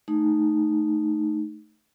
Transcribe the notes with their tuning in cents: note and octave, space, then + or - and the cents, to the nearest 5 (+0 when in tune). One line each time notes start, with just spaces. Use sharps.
A3 -5 D#4 -5